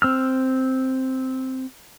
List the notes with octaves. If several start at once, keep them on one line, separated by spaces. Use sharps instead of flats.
C4 E6 F6